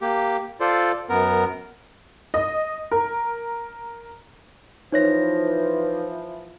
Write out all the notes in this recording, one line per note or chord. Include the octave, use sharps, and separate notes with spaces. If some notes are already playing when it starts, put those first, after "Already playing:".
A#3 G4
F4 A4 C5 D5
F#2 B3 A#4
D#5
A#4
E3 F3 D#4 C#5 A#6